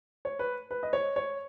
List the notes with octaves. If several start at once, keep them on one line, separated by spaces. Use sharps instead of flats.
C#5
B4
B4
D#5
C#5
C#5